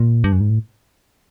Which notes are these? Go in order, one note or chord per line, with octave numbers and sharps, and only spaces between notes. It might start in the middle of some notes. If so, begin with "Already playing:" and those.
Already playing: A#2
G2
F#2
G#2
A2